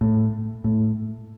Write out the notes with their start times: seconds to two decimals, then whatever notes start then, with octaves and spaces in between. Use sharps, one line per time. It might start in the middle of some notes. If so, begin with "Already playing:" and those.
0.01 A2
0.64 A2